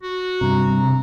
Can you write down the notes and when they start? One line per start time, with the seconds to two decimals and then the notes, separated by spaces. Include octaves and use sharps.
0.03 F#4
0.41 G2 C3 A#5
0.80 C3